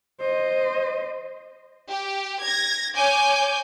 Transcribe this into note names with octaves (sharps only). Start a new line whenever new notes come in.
C5 D#5
G4
G#6 A#6
C#5 G#5 D6 G6